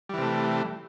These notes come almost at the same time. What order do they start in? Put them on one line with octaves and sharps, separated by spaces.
G3 E3 C3 A3